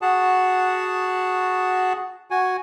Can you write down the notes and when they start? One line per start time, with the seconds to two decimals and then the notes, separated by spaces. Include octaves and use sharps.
0.02 F#4 G#4 F#5 A5
2.31 F#4 G#5